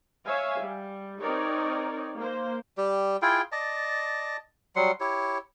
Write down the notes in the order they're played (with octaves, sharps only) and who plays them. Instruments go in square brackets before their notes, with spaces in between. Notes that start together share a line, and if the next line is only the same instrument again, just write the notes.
[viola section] C#5 E5 F5 G#5
G3
C4 D#4 A#4 C#5 D5
A#3 C5
[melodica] G3 G4
E4 F4 G#4 G5
D5 D#5 A5
F#3 G3 F#5 C6
E4 G4 C#5